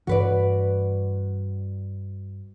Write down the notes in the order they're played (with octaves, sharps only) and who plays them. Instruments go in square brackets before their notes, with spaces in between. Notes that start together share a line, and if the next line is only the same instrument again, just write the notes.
[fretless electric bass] G2 E3 D4 [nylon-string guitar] F#4 B4 D5